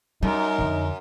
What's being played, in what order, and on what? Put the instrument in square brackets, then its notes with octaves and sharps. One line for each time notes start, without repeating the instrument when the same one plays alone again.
[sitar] F#2 [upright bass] G3 [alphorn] D#4 [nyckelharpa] A#4
[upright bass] F2 D3